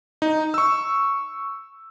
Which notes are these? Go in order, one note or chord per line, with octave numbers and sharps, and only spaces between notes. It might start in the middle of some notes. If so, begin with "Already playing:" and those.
D#4
C#6 E6